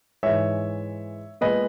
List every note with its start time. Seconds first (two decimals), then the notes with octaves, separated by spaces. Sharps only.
0.23 G#2 E3 G#3 C#5 E5
1.41 A#2 G#3 B3 B4 D#5